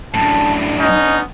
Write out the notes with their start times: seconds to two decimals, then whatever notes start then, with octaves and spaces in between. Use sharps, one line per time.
0.14 F#2 A2 D4 A5
0.80 B3 C#4 D#4 D#5